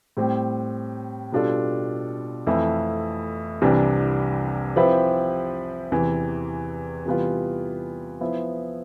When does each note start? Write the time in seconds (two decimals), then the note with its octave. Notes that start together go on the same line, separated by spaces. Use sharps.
0.17 A2 G3 C4 G4
1.32 B2 G3 D4 F4 A4
2.47 F2 E3 A3 E4
3.62 C2 C3 E3 G3 D4
4.76 F3 C4 E4 G4 B4
5.91 E2 C3 E3
7.05 C3 E3 G3 B3 F4
8.21 F3 B3 E4